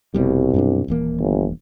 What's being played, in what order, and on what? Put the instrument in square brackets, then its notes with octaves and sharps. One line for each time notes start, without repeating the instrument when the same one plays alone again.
[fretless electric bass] F1 B2 G3 [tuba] C2
[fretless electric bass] F#2 B2 D4
D#1 E3 A#3
[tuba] G1